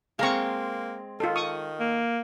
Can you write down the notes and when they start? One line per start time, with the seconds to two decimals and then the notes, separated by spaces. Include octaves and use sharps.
0.19 G#3 A#3 C4 F5 A#5 C#6
1.20 D#3 F4 A4
1.36 C#6 D#6
1.80 A#3